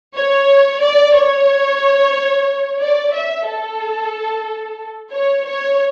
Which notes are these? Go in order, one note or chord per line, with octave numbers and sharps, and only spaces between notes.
C#5
D5
C#5
D5
E5
A4
C#5
C#5